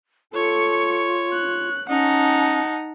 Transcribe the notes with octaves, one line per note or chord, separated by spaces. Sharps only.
F4 A4 C#5 C#6
F#6
C#4 D#4 F#5 A5 A#5